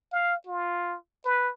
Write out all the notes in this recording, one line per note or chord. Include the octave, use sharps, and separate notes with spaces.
F5
F4
B4